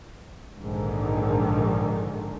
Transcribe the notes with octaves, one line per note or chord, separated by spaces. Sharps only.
A#1 G#2 D3 D#3